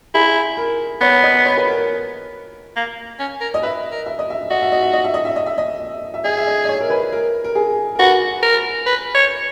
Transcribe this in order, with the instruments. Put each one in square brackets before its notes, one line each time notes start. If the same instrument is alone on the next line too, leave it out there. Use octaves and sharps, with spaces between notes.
[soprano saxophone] E4 [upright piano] G#4
[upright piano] A#4
[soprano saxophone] B3 [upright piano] C#5
[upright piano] D#5
C#5
B4
A#4
[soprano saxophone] A#3
C#4
A#4
[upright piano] D#5
[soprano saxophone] B4 [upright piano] E5
[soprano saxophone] A#4
[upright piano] E5
D#5
E5
[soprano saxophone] F#4 [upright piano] D#5
[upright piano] E5
D#5
E5
D#5
E5
D#5
E5
D#5
E5
D#5
E5
[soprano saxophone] G#4 [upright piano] D#5
[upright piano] E5
D#5
D#5
C#5
A#4
B4
A#4
A#4
G#4
A#4
[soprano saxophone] F#4 [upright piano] B4
[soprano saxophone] A#4
B4
C#5